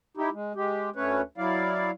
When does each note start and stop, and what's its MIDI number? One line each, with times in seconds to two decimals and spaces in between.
0.17 0.30 63
0.17 0.30 64
0.17 0.30 67
0.33 0.53 56
0.56 0.90 56
0.56 0.90 67
0.96 1.22 38
0.96 1.22 57
0.96 1.22 61
0.96 1.22 71
0.96 1.22 73
1.38 1.91 54
1.38 1.91 64
1.38 1.91 74
1.38 1.91 77